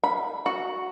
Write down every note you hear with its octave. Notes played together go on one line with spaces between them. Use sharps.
B5
F#4